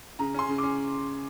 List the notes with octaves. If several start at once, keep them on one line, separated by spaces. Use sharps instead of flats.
C#3 A#5
C#4 C6
C#3
C#4 D6